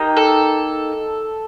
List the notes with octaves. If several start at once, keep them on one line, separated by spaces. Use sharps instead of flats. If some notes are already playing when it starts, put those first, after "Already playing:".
Already playing: A#3 D#4 G4
A4